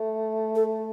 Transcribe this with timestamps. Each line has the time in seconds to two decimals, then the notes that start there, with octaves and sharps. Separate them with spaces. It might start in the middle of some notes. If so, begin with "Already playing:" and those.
Already playing: A3
0.55 A4